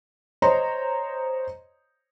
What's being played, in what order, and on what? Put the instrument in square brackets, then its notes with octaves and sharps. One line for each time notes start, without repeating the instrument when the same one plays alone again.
[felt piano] C5 C#5 D#5 A#5 C6